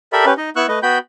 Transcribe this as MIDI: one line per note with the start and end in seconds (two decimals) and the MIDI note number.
0.13 0.25 67
0.13 0.25 69
0.13 0.25 70
0.13 0.25 74
0.13 0.25 76
0.13 0.25 83
0.25 0.34 61
0.25 0.34 67
0.25 0.34 71
0.37 0.50 63
0.37 0.50 75
0.56 0.66 59
0.56 0.66 64
0.56 0.66 85
0.56 0.66 88
0.56 0.66 90
0.68 0.79 57
0.68 0.79 71
0.68 0.79 75
0.83 0.98 59
0.83 0.98 66
0.83 0.98 79
0.83 0.98 83
0.83 0.98 91